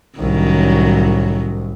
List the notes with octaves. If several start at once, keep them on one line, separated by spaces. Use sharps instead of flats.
C2 A2 D#3 F#3 C#4